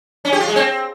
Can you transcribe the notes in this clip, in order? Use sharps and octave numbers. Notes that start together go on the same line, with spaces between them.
C#4
G4
F4
G#3
C4